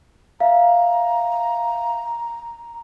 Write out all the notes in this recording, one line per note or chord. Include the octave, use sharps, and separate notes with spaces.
E5 F5 A#5